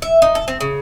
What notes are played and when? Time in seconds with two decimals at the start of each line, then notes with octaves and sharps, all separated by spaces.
0.02 E5
0.22 D#4
0.35 A4
0.48 C4
0.61 C#3